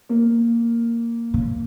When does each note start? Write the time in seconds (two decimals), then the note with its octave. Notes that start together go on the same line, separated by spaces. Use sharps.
0.09 A#3
1.34 C#3